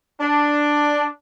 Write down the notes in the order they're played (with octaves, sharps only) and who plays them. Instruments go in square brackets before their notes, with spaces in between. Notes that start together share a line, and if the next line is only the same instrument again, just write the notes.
[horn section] D4